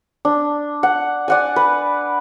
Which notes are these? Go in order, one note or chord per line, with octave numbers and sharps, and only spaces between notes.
D4
F#5
D5 F#5 G#5
B4